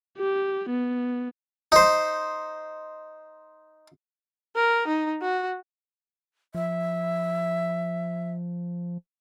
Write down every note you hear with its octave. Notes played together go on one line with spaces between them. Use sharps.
G4
B3
D#4 C5
A#4
D#4
F#4
F3 E5